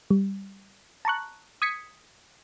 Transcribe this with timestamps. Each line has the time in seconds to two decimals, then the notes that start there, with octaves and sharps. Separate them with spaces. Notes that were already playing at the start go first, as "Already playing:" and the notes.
0.11 G3
1.05 A5 A#5 C#6 F#6
1.62 D#6 G#6 B6 C#7